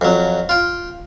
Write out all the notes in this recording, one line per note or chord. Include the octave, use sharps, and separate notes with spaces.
F2 F#3
F4 G5